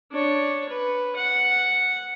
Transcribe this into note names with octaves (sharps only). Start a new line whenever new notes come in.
D4 C#5
B4
F#5